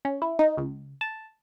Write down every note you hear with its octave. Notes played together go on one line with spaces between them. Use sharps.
C#4
E4
D#4
C#2
A5